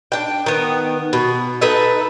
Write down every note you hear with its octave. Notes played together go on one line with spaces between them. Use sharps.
D4 G5
D#3 B3
B2
D#4 A4 B4 E5